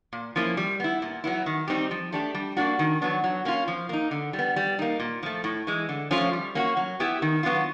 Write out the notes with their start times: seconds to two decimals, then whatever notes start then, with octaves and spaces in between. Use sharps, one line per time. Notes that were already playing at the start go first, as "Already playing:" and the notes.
0.13 A#2
0.36 F3 A#3 C#4 E4
0.57 G3
0.80 B3 E4
1.02 A#2
1.24 F#3 B3 E4
1.46 D#3
1.68 G3 C4 D#4 G4
1.91 F3
2.12 A3 D4 G4
2.35 G3
2.57 A#3 D4 F#4
2.79 D#3
3.02 F#3 B3 D4
3.24 F#3
3.45 A#3 C#4 F4
3.68 F3
3.89 A#3 D#4
4.11 D3
4.33 G3
4.39 B3
4.56 G3
4.79 A#3 D#4
5.00 A#2
5.23 F3 A3
5.44 A2
5.67 E3 G#3
5.89 D3
6.11 F3 A3 C#4 F4
6.33 G3
6.55 A#3 C#4 F#4
6.77 F#3
7.00 B3 E4 G4
7.22 D#3
7.43 F#3 B3 D4 F4